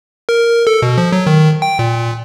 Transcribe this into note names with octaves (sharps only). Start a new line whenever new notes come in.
A#4
A4
B2
F3
F#3
D#3
G5
A#2